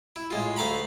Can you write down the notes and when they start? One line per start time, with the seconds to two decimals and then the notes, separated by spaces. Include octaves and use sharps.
0.16 E4
0.30 A2 G#3 F4
0.56 D2 A3 F5 A#5 B5